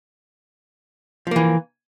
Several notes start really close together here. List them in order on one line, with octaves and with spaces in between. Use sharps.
F3 A#3 E3